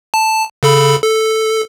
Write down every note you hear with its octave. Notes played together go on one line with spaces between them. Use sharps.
A5
C#3 A4 B5
A4